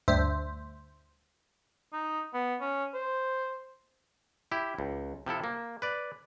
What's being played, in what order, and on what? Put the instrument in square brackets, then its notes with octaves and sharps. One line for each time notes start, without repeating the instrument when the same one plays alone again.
[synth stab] D2 G2 C5 E5
[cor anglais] D#4
B3
C#4
C5
[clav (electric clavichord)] E4 G4
C#2
C3 F3 E4 A4
A#3
B4 D5